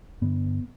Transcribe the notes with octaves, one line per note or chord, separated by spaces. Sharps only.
G2 D3 B3